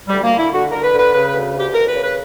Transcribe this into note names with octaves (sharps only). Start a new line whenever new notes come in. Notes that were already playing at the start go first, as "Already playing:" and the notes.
D2 G3
A#3
D3
E4
D3 F#4
D3 A#4
B4
D3
B4
C#3 B4
B4
D2
D2
G4
E2 A#4
B4
C#3
B4